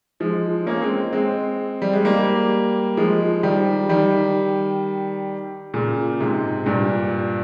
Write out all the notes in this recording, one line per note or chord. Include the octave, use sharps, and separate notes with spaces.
F3 G#3
A#3 C#4
G#3 C4
G#3 C4
G3
G#3
G3 A#3
F3 G#3
D#3 G3
D#3 G3
A#2 C#3
G#2 C3
G2 A#2